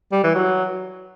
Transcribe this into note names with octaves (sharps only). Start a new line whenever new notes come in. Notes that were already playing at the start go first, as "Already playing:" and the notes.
G3
E3
F#3